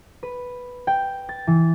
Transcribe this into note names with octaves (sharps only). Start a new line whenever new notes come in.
B4
G5
A6
E3